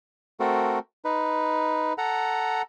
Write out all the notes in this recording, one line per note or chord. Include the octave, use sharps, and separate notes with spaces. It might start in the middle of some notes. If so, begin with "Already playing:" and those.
A3 C4 F#4 A4 A#4
D#4 B4
A4 F#5 A#5